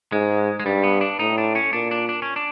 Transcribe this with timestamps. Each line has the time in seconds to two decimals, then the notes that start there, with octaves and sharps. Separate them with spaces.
0.12 G#2 G#3
0.60 G#3
0.65 G2 G3
0.83 B3
1.01 D4
1.19 A2 D#4
1.38 D4
1.55 C#4
1.73 A#2 D4
1.91 D4
2.09 D4
2.22 C#4
2.36 D4